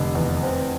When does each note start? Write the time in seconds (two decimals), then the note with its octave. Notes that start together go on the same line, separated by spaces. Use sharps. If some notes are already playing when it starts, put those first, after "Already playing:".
Already playing: F1 D3
0.15 E2
0.43 C4